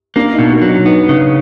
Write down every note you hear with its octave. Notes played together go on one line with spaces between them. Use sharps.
A#3 D4
D#4
B2
D4
F#3
D#4
B3 D#4
C#3